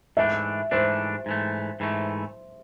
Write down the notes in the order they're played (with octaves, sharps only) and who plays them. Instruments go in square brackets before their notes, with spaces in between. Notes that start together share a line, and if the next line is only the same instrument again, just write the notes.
[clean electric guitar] G#2 E3 A3 D4 [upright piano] E5
[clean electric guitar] G#2 E3 A3 D4 [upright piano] C5
[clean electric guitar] G#2 E3 A3
G#2 E3 A3